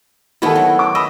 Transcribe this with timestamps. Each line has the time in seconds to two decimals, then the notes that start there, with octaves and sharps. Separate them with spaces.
0.42 D#3 A3 B3 E4 A4
0.55 F#3
0.79 D6
0.95 D#5 B5 D#6 E6